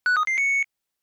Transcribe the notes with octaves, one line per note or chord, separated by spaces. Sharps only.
F#6
D#6
C7
C#7